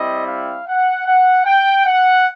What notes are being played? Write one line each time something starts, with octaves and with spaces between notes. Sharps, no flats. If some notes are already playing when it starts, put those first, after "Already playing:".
Already playing: G3 C4 E4 D#5
F5
F#5
F#5
G5
F#5